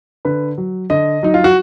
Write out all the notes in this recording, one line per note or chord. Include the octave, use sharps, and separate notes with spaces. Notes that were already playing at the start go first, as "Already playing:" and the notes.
D3 B4
F#3
D3 D#5
F#3 D#4
F4
F#4